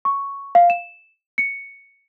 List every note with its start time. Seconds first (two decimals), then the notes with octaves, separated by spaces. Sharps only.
0.05 C#6
0.55 F5
0.70 E7
1.38 C#7